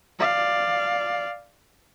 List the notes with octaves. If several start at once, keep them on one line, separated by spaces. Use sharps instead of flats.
D5 F5